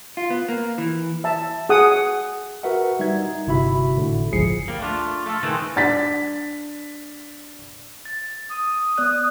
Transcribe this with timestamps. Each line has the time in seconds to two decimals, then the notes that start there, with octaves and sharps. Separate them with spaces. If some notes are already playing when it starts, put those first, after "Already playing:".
0.17 F4
0.30 B3
0.49 A#3
0.78 E3
1.24 E5 A5
1.69 G#4 F#5 D#6
2.63 F#4 A#4 B4 E5 F#5
2.99 G3 D#4 E5 G#6
3.22 D#4
3.47 G1 C3 E4 F#4 E5 B5
3.97 A2 D3
4.32 G1 C#2 F3 G#4 C7 C#7
4.68 G3 A#3
4.81 A3 D4 F4
5.26 A3 F4 A4
5.43 D#3 E3 G#3 A3 C4 D#4
5.76 D4 A6 B6
8.05 A6
8.50 D#6
8.98 B3 D5 F#6